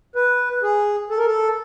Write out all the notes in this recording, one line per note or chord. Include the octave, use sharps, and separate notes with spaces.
B4
G#4
A4
A#4
A4